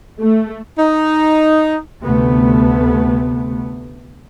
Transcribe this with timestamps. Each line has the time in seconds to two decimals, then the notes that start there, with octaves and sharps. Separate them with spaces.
0.19 A3
0.78 D#4
2.03 D2 C3 A3 B3